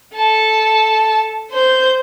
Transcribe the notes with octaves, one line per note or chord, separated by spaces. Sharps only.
A4 A5
C5 G6